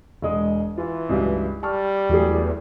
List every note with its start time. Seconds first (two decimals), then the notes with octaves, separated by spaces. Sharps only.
0.22 E1 G#3 D#6
0.78 E3 F4
1.09 C#2 G2 F#3
1.63 G3 A5 C#6 F6
2.09 E2 F#3 A3 G#4